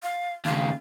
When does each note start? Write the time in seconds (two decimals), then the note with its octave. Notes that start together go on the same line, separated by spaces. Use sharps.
0.03 F5
0.45 D#2 C#3 F5